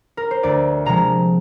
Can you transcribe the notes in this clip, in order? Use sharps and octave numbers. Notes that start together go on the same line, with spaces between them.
A#4
C5
D2 D5
C3 F3 G#3 A#5